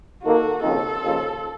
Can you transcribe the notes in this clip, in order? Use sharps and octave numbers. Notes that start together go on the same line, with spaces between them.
D#2 D#3 A#3 D#4 F#4 A4
D#2 C#3 F3 C4 D#4 A4
D#2 C#3 F3